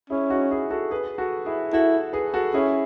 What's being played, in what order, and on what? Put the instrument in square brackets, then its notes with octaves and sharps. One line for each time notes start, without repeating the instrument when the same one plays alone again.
[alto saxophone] C#4 [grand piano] E4 G#4
[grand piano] D#4 F#4
E4 G#4
F#4 A4
G#4 B4
F#4 A4
E4 G#4
[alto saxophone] E4 [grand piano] F#4 A4
[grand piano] G#4 B4
F#4 A4
[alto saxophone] C#4 [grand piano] E4 G#4